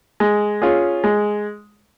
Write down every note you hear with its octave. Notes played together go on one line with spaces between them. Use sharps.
G#3
C#4 F4 G#4
G#3